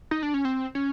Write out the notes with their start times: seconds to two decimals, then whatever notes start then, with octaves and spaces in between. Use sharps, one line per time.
0.11 D#4
0.23 D4
0.34 C#4
0.45 C4
0.75 C#4